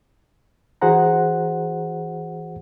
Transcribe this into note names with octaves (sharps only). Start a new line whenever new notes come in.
E3 F#4 G#4 C5 F#5 A#5